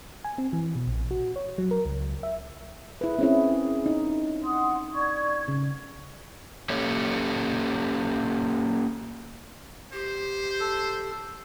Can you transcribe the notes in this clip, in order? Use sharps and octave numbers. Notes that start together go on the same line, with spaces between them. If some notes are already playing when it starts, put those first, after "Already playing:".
G#5
C4
E3
B2
A#1
F#4
C#5
F#3
A#4
C#2
E5
E4 G#4 B4 E5
C4 C#4 E4 G#4 A#4
D#4
F#5 C6 D#6
D5 C#6 G#6
C#3
A#3 C#4 G4 A4 C#5
G4 C5
A4